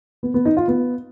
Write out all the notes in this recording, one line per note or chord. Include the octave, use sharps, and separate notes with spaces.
B3
B3
D#4
F4
B3